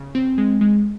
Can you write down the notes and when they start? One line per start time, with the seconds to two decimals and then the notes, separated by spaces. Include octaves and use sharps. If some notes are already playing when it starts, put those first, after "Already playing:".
Already playing: C#3
0.15 C4
0.38 G#3
0.61 G#3